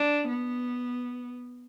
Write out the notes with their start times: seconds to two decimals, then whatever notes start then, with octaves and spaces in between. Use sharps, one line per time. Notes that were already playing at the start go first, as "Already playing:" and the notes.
Already playing: D4
0.28 B3